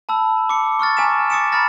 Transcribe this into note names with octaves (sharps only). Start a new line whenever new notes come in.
A5 B5 E6
D6 C#7
C#6 E6 F6 A6
G#5 A#5 D6 B6 E7
D6 D#6 A6 C#7 D7 E7
G#5 A#5 B5 F6 A6 A#6